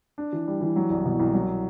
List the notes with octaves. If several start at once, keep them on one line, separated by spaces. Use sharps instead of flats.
D4
E3
G3
E3
F#3
C2
B2
C2
F#3